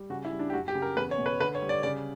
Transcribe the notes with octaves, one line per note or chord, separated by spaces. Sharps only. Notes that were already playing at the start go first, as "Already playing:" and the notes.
Already playing: G3
C#3 F#4
E4
G3
D4
G4
F#2 F#4
G4
C#3
A#4
E2 B4
C#5
B2
B4
D3 B4
C#5
G3
D5
C#3 D5